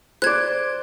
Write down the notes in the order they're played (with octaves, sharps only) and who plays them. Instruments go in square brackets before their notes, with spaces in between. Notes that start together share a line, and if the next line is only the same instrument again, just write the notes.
[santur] C5 D5 [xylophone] F#6 G#6